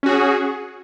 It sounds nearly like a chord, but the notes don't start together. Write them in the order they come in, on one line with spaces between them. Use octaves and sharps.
C#4 F#4 G#4